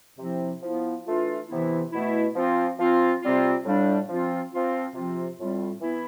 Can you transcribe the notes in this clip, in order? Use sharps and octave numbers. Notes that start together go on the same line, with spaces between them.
C3 F3 C4 E4
F3 B3 E4
E3 A3 D4 F4
C3 E3 B3 E4
B2 A3 E4
F3 C4 F4
F3 C4 F4
C3 G3 C4 F4
A2 G3 D4 F4
F3 C4 F4
F3 C4 F4
C3 F3 C4 F4
A2 G3 C4 F4
E3 B3 E4